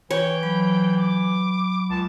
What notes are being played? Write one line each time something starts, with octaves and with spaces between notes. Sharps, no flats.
E3 C#5 G5
F#3 B5
D6
C#2 A5